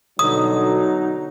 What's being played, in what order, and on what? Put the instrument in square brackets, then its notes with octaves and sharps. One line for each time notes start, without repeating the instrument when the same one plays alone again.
[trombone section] B2 D3 [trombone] F#3 [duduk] D#4 [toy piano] D#6